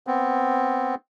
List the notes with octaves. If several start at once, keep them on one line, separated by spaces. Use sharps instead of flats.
B3 C4